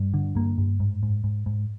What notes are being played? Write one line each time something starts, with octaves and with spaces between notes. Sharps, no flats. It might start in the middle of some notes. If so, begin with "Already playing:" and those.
Already playing: G2
D3
G2 A#3
G2
G#2
G#2
G#2
G#2